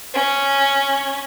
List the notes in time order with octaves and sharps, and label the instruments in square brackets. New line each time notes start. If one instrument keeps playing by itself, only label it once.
[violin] C#4